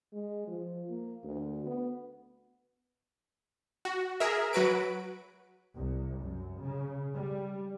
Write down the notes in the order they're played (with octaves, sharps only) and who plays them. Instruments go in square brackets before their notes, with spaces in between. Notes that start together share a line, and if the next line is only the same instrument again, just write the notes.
[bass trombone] G#3
F3
A#3
D2
B3
[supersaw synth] F#4
G#4 A#4 E5
F#3 F#4 B4 D7
[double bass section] C2
F#2
C#3
G3